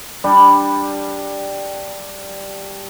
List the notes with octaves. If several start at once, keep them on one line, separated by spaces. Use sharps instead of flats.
G3 D4